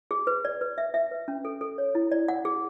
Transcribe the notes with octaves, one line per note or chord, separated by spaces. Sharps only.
G#4
B4
D5
B4
E5
E5
B4
C#4
A4
A4
C#5
E4
D5
F#5
G#4